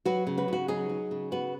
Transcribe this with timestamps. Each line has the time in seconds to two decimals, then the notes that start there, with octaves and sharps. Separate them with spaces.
0.05 F#3 F#4 B4
0.27 C#3
0.38 F#4 B4
0.48 C#3 F#4
0.68 F#3 D#4 G#4
0.89 F#3
1.11 C#3
1.31 B3 F#4 B4